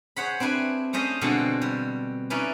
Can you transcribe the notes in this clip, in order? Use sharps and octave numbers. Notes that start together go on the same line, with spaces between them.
G#4 C5 C#5 F#5 B5
C4 D4 E4 B4 G#5
A3 C#4 C5 D#5 E5 A5
B2 D3 F3 G#3 C4 A4
G3
C#4 D#4 E4 B4 D5